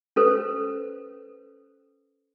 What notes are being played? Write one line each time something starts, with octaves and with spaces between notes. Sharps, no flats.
C#4 A4 B4 C5